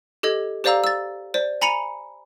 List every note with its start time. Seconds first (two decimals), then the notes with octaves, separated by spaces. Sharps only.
0.23 G4 A4 D#5 G#6
0.64 G4 C5 D5 F5 A#5 E6
0.84 E6 A6
1.34 C5 D5
1.61 G#5 A#5 B5 C#7 D#7 F7